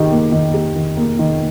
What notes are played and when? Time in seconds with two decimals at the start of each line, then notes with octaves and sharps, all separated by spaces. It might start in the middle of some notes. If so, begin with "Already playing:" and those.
Already playing: D#3 G4
0.11 A#3
0.32 D#3
0.54 G4
0.76 D#3
0.97 A#3
1.19 D#3